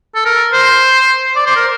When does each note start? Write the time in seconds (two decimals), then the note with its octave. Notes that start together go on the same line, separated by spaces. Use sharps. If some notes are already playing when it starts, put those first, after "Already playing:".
0.15 A4
0.25 A#4
0.53 C5
1.36 D5
1.46 C5
1.56 A#4